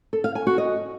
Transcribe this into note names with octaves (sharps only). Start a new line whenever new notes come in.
A4
F5
G#5
F#4
D#5